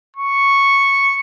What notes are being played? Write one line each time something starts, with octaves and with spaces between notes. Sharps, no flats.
C#6